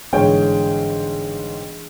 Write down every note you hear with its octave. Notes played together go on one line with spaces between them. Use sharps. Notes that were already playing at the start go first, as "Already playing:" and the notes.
G1 G#2 E3 D4 G#4 C#5 G5